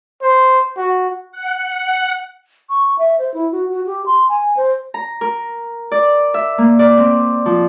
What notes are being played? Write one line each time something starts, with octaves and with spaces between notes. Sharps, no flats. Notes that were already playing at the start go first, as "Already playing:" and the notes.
C5
F#4
F#5
C#6
E5
C5
E4
F#4
F#4
G4
C6
G#5
C5
A#5
A#4
D5
E5
A#3
D5
C4
F3